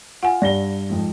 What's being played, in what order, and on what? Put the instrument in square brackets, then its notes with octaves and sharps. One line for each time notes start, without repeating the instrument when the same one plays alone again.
[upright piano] F4 [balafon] F#5 G#5
[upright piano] G2 A#6 G7 [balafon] D5
[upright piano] F2 G#2 F3